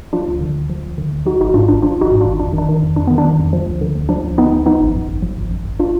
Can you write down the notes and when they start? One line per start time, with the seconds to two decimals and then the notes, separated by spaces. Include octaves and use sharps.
0.13 F3 D4 F4
0.28 D2
0.41 D3
0.55 D2
0.70 F3
0.84 D2
0.98 D3
1.12 D2
1.26 F3 D#4 F#4
1.40 G#1 D#4 F#4
1.54 G#2 D4 F4
1.68 G#1 D4
1.82 F3 D4 F4
1.97 G#1 D#4 F#4
2.11 G#2
2.21 G#1 D4 F4
2.39 F2 D4
2.53 D#3
2.58 D4
2.68 D#3
2.83 F2
2.96 F2 D4
3.07 D#3 B3
3.18 D4
3.24 D#3
3.39 F2
3.53 F3
3.67 D2
3.81 D3
3.96 D2
4.09 F3 D4
4.24 D2
4.38 D3 B3 D#4
4.52 D2
4.66 F3 B3 D#4
4.80 G#1
4.95 F#2
5.09 G#1
5.22 F3
5.37 G#1
5.51 F#2
5.65 G#1
5.80 D4 F4